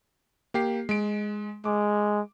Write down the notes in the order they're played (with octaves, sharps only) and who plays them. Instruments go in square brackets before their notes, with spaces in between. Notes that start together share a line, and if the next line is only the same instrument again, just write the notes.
[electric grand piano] A#3 G4 C7
G#3 D7
[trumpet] G#3 [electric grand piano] D6